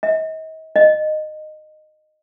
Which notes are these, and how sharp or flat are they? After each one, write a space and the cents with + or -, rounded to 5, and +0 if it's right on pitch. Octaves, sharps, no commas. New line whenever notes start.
D#5 +40
D#5 -15